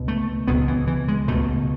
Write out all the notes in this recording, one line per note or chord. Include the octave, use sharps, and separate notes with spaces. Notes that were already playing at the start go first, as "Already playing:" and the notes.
Already playing: C#2 B2
A3
C#2 B2 B3
E3
E3
G#3
C#2 B2 A3